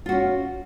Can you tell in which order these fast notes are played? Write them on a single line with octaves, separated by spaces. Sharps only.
F4 F#4 C#4